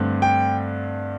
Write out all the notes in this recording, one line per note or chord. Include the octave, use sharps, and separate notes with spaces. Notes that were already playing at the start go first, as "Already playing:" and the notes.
Already playing: G2 D3 A3 C4
G5